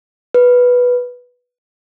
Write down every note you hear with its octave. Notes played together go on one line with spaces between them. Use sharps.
B4